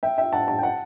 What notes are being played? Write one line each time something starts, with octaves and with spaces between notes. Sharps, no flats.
E5 G5
E5 G5
F#5 A5
F#5 A5
G5
F#5 A5